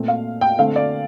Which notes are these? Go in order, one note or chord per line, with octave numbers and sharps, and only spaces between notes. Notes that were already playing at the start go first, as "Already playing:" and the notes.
Already playing: A#2 A3 C4
F5
G5
D3 A3 C4 F5
D5